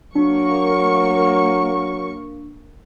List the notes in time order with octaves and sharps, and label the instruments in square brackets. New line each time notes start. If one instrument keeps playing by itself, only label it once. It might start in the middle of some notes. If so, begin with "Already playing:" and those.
[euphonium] F#3 [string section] A#3 C#6 [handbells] D4